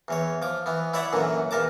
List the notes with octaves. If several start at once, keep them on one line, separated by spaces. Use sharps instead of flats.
E2 E3 C#5
F3 D6
E3 B3
E4 B4 C#5 D5 E5 F#5
F#2 A#2 D3 E3
E2 A#2 A#4 A5 D6